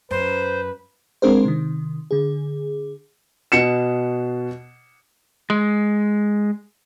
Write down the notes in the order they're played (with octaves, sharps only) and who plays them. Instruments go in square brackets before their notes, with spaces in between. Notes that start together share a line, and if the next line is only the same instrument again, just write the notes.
[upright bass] F#2 [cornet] B4 [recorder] C5
[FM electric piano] G#3 C4 D4 G#4 A#4 C5
C3 D#3
D3 G#4
[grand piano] B2 C#7 E7
[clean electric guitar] G#3